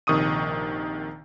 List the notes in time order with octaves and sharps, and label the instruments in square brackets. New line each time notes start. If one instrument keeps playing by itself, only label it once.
[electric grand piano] A#1 C3 D#3 C#6 D#6 D#7